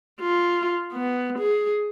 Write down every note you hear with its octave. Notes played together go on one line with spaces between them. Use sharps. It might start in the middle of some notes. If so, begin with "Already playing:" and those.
F4
B3
G#4